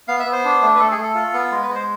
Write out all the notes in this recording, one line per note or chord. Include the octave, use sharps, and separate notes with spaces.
B3 F5
E5
B3
C5
D4
A3
B4
A3 A4
G#4
A3 A4
F4
B3
G#3
B4
G#3
C5